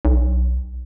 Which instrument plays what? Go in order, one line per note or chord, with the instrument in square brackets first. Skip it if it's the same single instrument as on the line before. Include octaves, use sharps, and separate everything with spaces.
[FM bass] B1